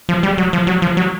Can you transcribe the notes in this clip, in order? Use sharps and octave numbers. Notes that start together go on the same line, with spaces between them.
F3
G3
F#3
F3
F#3
F3
F#3